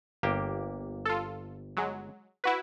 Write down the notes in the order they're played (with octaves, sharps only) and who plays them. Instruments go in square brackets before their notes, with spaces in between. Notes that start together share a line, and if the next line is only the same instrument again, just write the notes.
[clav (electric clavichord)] G1 A#3 G4
[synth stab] F4 A4
F#3 G#3
E4 F#4 B4